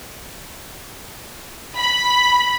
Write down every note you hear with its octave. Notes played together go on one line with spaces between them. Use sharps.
B5